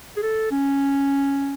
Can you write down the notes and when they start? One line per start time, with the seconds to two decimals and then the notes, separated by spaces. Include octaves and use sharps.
0.17 G#4
0.22 A4
0.51 C#4